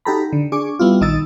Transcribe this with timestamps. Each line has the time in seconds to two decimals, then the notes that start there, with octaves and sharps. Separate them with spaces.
0.05 D#4 F#4 G4 A4 A#5 B5
0.33 D3
0.52 D4 G#4 G#5 C#6 D6
0.79 G3 B3 E4 F4
1.01 A#1 D#3 D#4 D#6 E6 A6